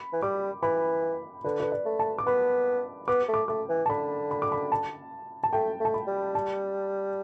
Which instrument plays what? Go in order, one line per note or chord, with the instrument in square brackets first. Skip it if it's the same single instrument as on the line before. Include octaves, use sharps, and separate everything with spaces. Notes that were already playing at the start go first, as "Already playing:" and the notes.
Already playing: [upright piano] B5
[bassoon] E3
[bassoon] G3 [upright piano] D6
[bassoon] E3 [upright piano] B5
[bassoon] D3 [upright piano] B4
[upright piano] B4
D5
[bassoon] A3
[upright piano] A5
D6
[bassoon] B3 [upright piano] B5
[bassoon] B3 [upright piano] D6
[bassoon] A3
[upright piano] D6
[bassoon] A3 [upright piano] D6
[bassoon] E3
[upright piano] A5
[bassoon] D3 [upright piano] B5
[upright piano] B5
D6
B5
A5
A5
[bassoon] A3 [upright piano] G5
[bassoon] A3 [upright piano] A5
[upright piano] B5
[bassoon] G3
[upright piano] A5